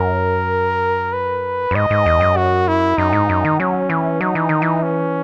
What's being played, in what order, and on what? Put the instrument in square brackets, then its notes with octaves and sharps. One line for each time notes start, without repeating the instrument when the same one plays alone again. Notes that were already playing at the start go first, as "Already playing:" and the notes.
Already playing: [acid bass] F#2 [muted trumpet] A#4
[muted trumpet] B4
[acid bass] F#2
[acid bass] G#2 [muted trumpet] D#5
[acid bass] G#2
E2
F#2
[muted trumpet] F#4
E4
[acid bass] F#2 [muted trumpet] D#4
[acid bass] G#2
F#2
D#3
[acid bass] F#3 [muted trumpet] C#4
[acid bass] E3
[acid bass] F#3 [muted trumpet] D#4
[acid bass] E3
D#3
E3
[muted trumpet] C#4